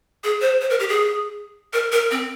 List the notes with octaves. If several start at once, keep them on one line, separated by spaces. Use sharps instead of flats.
G#4
C5
C5
A#4
G4
G#4
A#4
A#4
C4